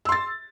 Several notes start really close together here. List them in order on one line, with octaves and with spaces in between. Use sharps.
E6 C6 A6